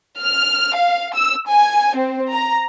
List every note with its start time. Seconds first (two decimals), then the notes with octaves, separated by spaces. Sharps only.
0.21 F6
0.75 F5
1.15 E6
1.46 G#5
1.96 C4
2.32 A#5